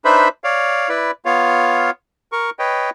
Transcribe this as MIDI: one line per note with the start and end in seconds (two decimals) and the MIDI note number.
0.05 0.28 62
0.05 0.28 63
0.05 0.28 71
0.05 0.28 72
0.05 0.28 76
0.05 0.28 83
0.44 0.89 73
0.44 0.89 74
0.44 0.89 77
0.89 1.11 64
0.89 1.11 71
0.89 1.11 74
1.25 1.90 59
1.25 1.90 65
1.25 1.90 73
1.25 1.90 77
2.32 2.50 70
2.32 2.50 85
2.59 2.90 71
2.59 2.90 73
2.59 2.90 75
2.59 2.90 79